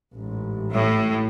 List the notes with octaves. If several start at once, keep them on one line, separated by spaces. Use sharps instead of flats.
A1 G#2
A2